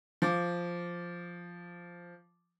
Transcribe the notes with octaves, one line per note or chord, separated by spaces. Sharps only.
F3 D6